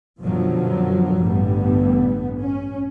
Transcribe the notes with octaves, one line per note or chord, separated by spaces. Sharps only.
F#2 B2 D3 F3 F#3
A1 G2 D3 G3 B3
C#4